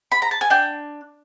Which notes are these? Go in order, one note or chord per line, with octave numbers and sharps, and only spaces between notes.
B5
A#5
A5
G#5
D4 G5